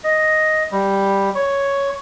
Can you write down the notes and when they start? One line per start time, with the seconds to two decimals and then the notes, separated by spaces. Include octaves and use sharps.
0.04 D#5
0.72 G3
1.35 C#5